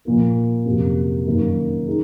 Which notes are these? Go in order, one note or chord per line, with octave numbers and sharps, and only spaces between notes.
A#2 F3 A#3
F2 C3 F#3 A#3 C#4
F#2 D#3 A#3 C#4
D#4 G#4